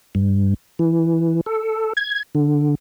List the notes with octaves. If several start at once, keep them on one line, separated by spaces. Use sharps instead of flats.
G2
E3
A4
G#6
D3